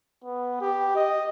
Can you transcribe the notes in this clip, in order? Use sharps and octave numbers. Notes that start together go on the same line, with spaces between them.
B3
G4
D#5